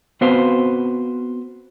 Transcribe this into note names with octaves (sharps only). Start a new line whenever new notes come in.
B3 C4 F#4 B4 C5 F5